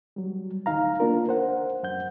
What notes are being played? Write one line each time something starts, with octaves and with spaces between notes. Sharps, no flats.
F#3 G3
D2 D#3 D#4 F5 A#5
A#3 D4 F4 A#4
C5 F#5
F#2 F#5 G6